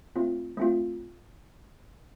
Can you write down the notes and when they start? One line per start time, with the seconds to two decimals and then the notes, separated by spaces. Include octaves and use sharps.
0.16 A3 C4 F4
0.57 A3 C4 F4